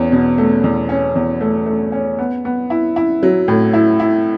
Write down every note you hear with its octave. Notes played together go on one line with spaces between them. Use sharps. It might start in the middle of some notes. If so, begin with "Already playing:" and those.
Already playing: E2 C#4
B2
A3
E2
C#4
E2
A3
A3
C#4
B3
B3
E4
E4
F#3
A2
E4
E4